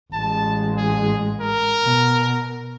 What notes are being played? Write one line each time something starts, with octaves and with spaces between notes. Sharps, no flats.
A1 G#3 A5
G#4
A#4
B2